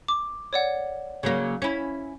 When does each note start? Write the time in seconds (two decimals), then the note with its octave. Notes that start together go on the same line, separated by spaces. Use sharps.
0.08 D6
0.53 C#5 D5 F#5
1.23 C#3 F#3 A#3
1.62 C#4 E4